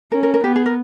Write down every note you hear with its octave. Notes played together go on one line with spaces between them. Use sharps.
C#4 A#4
A#4
A#4
B3 G4
G#4
A#4